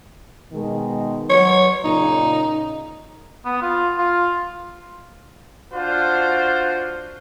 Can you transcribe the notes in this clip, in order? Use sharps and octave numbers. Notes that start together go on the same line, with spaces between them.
B2 D#3 G#3
F#3 C#5
A#2 C#3 D#4
B3
F4
F4
D4 F4 F#4 C5